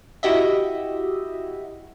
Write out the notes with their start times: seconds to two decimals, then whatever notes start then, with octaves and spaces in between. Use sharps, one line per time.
0.23 E4 F#4 G4 D#5 E5